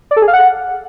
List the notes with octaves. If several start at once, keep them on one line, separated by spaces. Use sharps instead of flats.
D5
A4
G#4
F5
F#5